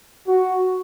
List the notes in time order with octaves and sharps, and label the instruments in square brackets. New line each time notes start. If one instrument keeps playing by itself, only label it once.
[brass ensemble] F#4